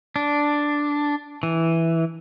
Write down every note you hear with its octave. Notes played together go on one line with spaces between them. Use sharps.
D4
E3